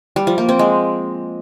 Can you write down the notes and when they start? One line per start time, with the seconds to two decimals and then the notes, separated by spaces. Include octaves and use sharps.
0.16 G3
0.27 F3
0.38 A#3
0.49 C4
0.59 G#3